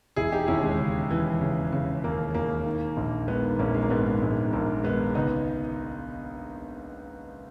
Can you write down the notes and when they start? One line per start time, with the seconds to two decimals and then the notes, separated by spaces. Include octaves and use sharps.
0.16 E1 E4 G#4
0.32 D#4 G4
0.48 D#2 C#4 E4
0.63 G#3
0.79 C#3
1.11 E3
1.41 C#3
1.73 C#3
2.04 D#2 A#3
2.35 D#2 A#3
2.66 D#3
2.97 A#1
3.28 D#3 G#3 B3
3.59 A#1 A#3 C#4
3.74 G#3
3.82 A#3
3.90 G#2 G#3 B3
4.22 A#1 G#3
4.53 A#1 A#3
4.83 D#3 G#3 B3
5.15 C#2 B3 D#4